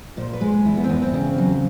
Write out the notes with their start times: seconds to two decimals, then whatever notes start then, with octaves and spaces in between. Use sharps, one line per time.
0.17 A#2 C5
0.33 B4
0.41 G#3
0.65 E2 E4
0.77 B3
0.84 C4
0.90 E2 B3
1.02 C4
1.14 C#3
1.38 F#3